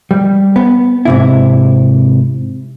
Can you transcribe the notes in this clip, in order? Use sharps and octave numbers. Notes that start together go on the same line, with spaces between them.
G3
B3
G#2 C3 E4